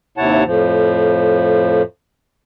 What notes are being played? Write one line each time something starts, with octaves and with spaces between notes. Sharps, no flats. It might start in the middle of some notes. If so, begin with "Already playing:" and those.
D#2 C3 E4 C#5 F#5 A5
F2 A2 F3